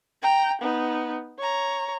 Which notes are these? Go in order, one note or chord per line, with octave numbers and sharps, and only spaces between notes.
G5 A#5
B3 D#4
C#5 A#5